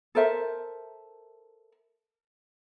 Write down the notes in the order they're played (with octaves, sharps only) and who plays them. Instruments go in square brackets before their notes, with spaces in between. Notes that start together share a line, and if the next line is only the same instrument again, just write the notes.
[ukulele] A4 A#4 C5 E5